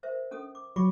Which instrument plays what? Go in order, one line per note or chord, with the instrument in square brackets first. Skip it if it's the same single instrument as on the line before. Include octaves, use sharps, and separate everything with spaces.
[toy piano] A#4 C5 E5
C#4 A4 D#6
D6
[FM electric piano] F#3 [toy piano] B5 C#6 D6